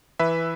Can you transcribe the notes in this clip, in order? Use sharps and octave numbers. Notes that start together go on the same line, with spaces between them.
E3 B4 E5